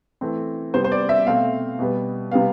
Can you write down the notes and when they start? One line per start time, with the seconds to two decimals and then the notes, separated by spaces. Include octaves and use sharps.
0.21 E3 A3 C4
0.74 C3 G3 B3 C5
0.84 C5
0.92 D5
1.09 E5
1.26 B2 A3 C4 F5
1.79 B2 G3 B3
2.31 C3 G3 B3 F5